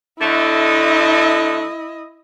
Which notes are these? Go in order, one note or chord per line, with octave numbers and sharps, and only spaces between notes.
D3 A3 E4 D#5